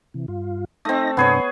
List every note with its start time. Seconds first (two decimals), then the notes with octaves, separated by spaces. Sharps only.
0.14 C3 E3
0.28 G2 F4
0.85 A3 C4 D#4 D#5 A#6
1.17 G2 C3 B3 D4 G#4 C#5